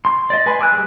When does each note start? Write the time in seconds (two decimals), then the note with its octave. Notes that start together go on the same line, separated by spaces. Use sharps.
0.05 C6
0.30 D5 D#5
0.46 B4 G#5 B5 C6
0.59 G#5 D6 E6 F#6
0.72 G3 G#3